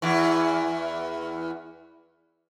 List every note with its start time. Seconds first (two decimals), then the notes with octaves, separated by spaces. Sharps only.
0.02 E2 E3